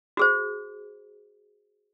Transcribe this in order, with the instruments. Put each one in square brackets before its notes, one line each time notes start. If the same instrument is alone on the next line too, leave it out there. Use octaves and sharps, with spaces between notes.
[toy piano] F#4 G#4 C5